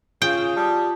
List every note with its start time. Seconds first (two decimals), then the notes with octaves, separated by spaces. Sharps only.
0.22 C#3 F4 G5
0.56 G3 A5 D#6